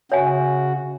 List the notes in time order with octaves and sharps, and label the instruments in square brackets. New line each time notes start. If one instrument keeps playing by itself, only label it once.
[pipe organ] C#3 F#4 [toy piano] C#5 E5 G#5